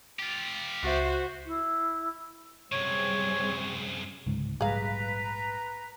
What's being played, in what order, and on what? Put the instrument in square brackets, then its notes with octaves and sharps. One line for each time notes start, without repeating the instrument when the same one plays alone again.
[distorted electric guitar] F4 G4
[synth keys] C#2 E5 [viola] F#4 C5
[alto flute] E4
[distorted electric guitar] F#2 C3 [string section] G3 C4 G#4 [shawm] C#5
[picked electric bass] D1 C#2 G#2
[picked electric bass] A#1 G#2 G3 [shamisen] G#4 F5 [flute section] B4 A#5